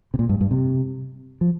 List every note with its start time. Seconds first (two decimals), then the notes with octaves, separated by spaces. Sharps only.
0.14 C3
0.19 A#2
0.29 G2
0.41 G2
0.51 C3
1.41 F3